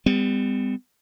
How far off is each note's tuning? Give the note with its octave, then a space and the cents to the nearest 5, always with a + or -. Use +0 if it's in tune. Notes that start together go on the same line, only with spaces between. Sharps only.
G3 +35 B3 +45